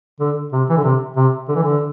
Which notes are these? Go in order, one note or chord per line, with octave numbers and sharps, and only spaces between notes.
D3
C3
E3
D3
C3
C3
D3
E3
D3